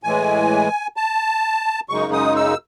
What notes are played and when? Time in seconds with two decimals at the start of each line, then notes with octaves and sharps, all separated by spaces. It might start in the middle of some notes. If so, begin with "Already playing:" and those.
0.04 A2 E3 G#3 G#5
0.96 A5
1.89 F#2 C#3 G#3 D#4 C#6
2.13 D#6
2.36 E6